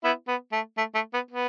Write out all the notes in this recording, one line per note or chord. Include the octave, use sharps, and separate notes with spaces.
B3 E4
B3
A3
A3
A3
B3
B3